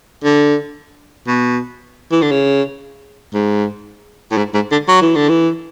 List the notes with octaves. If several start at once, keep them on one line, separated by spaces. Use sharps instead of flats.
D3
B2
E3
D3
C#3
G#2
A2
G#2
G#2
D3
F#3
E3
D3
E3